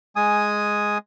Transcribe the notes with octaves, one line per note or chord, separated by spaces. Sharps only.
G#3 G#5 D#6